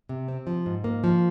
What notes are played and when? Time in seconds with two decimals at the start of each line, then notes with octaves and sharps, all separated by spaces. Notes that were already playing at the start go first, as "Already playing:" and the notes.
0.09 C3
0.28 C4
0.47 F3
0.66 G#2
0.84 A#3
1.04 F3